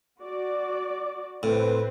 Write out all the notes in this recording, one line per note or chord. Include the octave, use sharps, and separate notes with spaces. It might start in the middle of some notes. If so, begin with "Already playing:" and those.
F#4 D5
A2 C4 B4